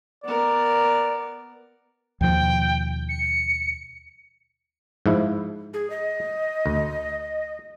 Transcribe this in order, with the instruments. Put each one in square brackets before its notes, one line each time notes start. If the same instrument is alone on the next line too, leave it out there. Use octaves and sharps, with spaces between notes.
[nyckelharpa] B3 A#4 [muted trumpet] D5
[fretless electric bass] D#2 B2 F3 [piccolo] G5
[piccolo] C#7
[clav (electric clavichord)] G#2 F3 E4
[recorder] G#4
D#5
[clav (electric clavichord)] D2